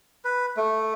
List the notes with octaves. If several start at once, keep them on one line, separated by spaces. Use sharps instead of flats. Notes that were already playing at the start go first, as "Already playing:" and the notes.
B4
A3